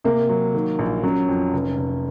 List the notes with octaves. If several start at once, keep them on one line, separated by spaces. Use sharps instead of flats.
C3 A#3
F#3
D#3
A#1
F#3 C#4
F2
F1
F1